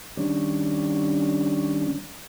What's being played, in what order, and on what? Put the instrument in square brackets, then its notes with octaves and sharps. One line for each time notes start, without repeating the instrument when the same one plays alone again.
[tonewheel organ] D#3 G3 C#4 D4